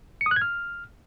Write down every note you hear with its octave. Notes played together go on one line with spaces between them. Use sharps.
C#7
D#6
F#6
G#6
F6